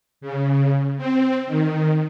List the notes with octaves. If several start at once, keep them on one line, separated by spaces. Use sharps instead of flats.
C#3
C4
D#3